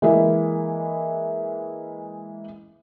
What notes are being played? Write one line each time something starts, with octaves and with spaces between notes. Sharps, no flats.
E3 G#3 A#3 E4